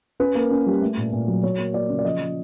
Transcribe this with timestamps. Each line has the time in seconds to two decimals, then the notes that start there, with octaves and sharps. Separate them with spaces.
0.20 C#4 B4
0.35 A#3
0.51 C#4
0.67 G3
0.82 A3
0.97 A#2
1.13 A#2
1.28 F#3
1.43 F#3 C#5
1.58 A#3
1.74 A#3 D5
1.89 C#3
1.99 D5
2.04 F3 D#5
2.20 F3